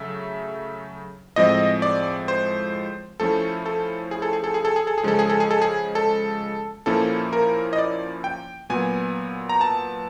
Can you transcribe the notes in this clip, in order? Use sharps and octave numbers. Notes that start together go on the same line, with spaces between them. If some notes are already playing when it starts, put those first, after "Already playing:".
Already playing: C#3 F#3 A3 E5
A2 F3 G#3 C4 D#5
D5
C5
F3 A3 C#4 E4 A4
A4
G#4
A4
G#4
A4
G#4
A4
G#4
A4
G#4
C#3 F3 G#3 C#4 A4
G#4
A4
G#4
A4
G#4
A4
A#2 F3 A#3 C#4 E4 A4
A#4
D#5
D5
G5
A#2 F#3 B3 G#5
A#5
A5